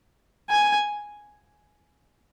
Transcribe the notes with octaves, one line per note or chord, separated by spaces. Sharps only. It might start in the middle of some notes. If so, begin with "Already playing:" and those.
G#5